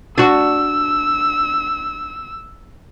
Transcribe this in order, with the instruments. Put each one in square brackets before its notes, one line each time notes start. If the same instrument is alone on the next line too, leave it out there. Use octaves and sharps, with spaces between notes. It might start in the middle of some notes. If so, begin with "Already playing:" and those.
[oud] D4 F#4 [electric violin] E6